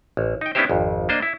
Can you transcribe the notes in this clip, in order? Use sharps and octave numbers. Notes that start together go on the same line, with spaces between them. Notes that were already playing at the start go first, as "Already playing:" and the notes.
A1
D#4 G5
B3 C#4 D#4 E4 G4 C5
G#1 F2
A#3 D4 C5 D#5
E4